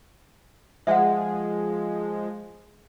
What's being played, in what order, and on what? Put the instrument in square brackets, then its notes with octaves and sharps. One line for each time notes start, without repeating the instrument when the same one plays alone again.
[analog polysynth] F3 G#3 [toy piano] E5 F#5